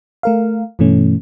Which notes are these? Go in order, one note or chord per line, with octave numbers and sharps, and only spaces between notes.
A3 A#4 F5
G2 B2 E3 A3 C#4